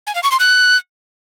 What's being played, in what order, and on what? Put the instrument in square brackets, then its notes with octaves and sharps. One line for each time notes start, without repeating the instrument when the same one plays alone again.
[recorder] G#5
F5
C#6
C6
F#6